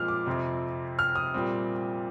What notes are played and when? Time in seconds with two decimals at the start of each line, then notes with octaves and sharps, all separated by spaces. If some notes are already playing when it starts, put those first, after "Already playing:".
Already playing: A#2 F3 G#3 C4 F6
0.08 D6
0.26 F2 C3 F3 C4
0.99 F6
1.15 D#6
1.34 A#2 G3 C4